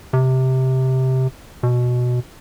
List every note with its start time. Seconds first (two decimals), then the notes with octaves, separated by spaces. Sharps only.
0.13 C3
1.63 B2